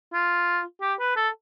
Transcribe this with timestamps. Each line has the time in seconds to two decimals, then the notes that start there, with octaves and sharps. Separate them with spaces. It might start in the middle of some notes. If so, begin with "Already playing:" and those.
0.13 F4
0.81 G4
0.99 B4
1.16 A4